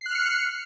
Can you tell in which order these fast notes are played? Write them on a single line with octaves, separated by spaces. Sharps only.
C7 F#6 F6 C#7